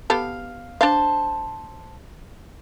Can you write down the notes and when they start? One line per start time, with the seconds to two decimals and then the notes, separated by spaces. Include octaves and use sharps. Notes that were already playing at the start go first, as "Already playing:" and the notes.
0.10 B3 G4 A4 F5
0.81 D4 C5 F5 A5